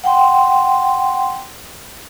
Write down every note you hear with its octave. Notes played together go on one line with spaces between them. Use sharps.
F#5 G5 C6